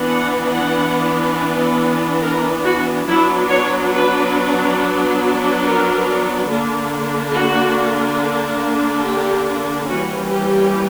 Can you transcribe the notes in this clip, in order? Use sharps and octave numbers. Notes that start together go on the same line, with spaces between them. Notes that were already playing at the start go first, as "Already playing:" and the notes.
Already playing: E3 B3 D4
F#5
F#5
A#4
F#4
F#3 B3 D4 E4
C#5
B4
A#4
D3 A#3 D4
F#4
G4
E3 G3 A#3 C#4 F#4
G4